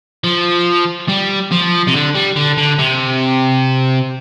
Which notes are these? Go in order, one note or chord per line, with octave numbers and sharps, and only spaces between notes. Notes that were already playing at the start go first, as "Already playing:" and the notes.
F3
G3
F3
C3
D3
G3
D3
D3
C3